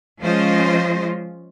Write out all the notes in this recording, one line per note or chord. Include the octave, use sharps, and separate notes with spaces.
F3 G#3 C#4 F4 C5 D#5